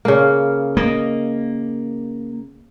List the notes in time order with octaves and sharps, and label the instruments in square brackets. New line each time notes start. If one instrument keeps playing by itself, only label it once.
[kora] C#3 A#3
[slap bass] A#3 [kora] D#5